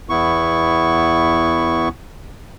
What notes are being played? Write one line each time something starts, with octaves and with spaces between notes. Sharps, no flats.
E2 B3 E4 C#6